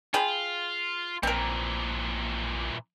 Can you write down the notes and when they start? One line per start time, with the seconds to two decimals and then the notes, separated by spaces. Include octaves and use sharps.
0.14 F4 G#4 G5 B5
1.23 A#1 A#2 E3 C4 A#4